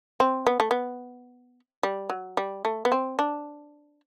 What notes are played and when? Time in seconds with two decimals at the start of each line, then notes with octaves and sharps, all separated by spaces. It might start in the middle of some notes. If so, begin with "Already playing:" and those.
0.20 C4
0.46 B3
0.60 A3
0.71 B3
1.83 G3
2.10 F#3
2.37 G3
2.65 A3
2.85 B3
2.92 C4
3.19 D4